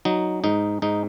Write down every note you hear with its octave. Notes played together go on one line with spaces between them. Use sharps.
F#3 D#4
G#2 D#4
G#2 D#4